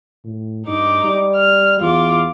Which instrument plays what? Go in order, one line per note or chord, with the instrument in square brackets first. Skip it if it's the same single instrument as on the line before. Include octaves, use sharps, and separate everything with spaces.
[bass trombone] A2
[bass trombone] G2 [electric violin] D#4 D6
[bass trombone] G3
[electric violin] F6
[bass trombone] E2 [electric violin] F4 D6